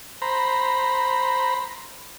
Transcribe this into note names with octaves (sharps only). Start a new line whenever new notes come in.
C5 A#5 B5